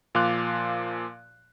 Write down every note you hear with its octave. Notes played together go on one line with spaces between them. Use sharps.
A#2 F3 F5 C6 D6 F#6